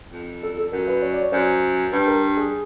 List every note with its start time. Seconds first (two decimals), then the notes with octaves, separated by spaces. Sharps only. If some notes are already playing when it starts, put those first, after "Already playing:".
0.13 F2
0.43 A4
0.58 A4
0.72 F#2 A#4
0.87 B4
1.02 C#5
1.13 D5
1.22 C#5
1.32 F#2 C5
1.92 G2 B4
2.07 A#4
2.37 G#4